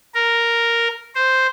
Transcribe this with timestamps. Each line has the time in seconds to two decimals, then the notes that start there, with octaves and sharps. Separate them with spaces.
0.15 A#4
1.15 C5